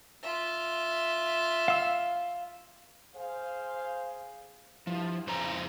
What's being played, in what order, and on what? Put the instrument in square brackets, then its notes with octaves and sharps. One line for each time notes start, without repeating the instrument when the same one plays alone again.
[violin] F4 E5
[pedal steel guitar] F5 E6
[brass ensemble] G#4 C5 F5
[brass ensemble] G2 E4 [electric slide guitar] F3
[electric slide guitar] F2 C5 A#5 [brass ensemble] C#3